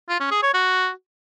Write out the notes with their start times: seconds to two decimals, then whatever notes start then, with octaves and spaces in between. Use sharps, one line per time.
0.09 F4
0.20 C#4
0.31 G#4
0.42 C#5
0.54 F#4